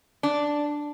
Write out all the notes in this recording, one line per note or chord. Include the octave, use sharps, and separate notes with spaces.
D4